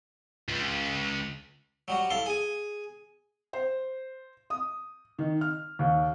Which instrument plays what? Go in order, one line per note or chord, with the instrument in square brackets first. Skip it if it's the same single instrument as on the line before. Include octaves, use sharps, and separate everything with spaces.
[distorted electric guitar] C#2
[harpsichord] F#3 G3 F#4
E4 A4 F5 C6
G#4 G#5
[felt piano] C5
D#6
D#3
F6
D#2